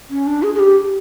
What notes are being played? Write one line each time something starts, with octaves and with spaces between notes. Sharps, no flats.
C#4
D4
G#4
G#4
G4